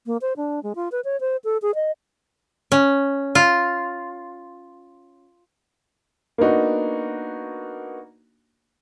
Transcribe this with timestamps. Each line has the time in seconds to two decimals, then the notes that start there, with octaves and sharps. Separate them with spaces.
0.06 A#3
0.22 C5
0.37 D4
0.63 G#3
0.75 F4
0.92 B4
1.05 C#5
1.20 C5
1.44 A4
1.62 G#4
1.75 D#5
2.72 C#4
3.35 F4
6.38 A#3 B3 D4 D#4 F#4